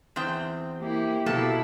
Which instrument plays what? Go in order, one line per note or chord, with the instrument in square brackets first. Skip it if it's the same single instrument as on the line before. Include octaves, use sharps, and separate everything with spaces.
[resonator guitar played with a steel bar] E2 C4 G5
[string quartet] A#3 E4 [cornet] G4
[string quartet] B2 E4 [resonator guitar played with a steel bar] A#3 A4 A5